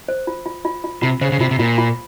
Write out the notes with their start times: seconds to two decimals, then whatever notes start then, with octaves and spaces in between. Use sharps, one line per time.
0.08 C5
0.27 F4
0.46 F4
0.65 F4
0.84 F4
1.02 C3 F4
1.21 C#3 C5
1.32 C#3
1.40 C3 F4
1.51 C3
1.59 A#2 F4
1.78 F4